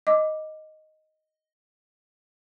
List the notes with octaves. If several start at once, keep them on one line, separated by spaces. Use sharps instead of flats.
D#5 D6